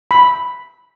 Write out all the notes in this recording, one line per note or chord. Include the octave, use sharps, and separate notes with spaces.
B5